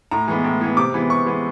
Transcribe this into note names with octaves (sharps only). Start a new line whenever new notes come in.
A2 A#5
E3 G#3 B3
A2
E3 G#3 B3
C3 D6
E3 G#3 B3
C3 C#6
E3 G#3 B3